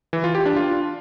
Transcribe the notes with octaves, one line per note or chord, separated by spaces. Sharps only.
E3
F4
G4
D4
F4